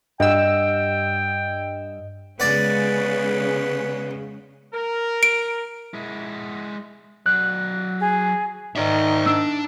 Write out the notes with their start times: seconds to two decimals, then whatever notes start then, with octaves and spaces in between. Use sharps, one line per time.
0.20 G2 D#5 F#5 G5 E6
2.40 C#3 G#3 B3 C#4 D5 F#5
4.73 A#4
5.23 D7
5.94 G#3 E4
7.26 F#3 D5 F#6
8.00 G#4
8.76 G#2 D#3 D5 E5
9.26 D4 E6